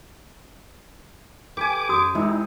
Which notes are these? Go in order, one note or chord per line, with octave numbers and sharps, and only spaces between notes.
G4 A4 B4 G#5 D6
F#2 C#4 F#4 D#6
C3 G#3 D#4 E4 A#4